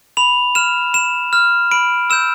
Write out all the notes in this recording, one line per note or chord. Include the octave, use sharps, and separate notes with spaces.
B5 F7
F6 E7
B5 E7
F6
B5 D7
E6 G6 E7